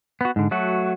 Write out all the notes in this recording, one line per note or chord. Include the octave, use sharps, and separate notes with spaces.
B3 F#4
G#2 D3
F#3 A3 F#4